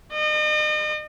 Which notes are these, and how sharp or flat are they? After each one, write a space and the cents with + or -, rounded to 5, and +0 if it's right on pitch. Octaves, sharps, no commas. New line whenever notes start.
D#5 -40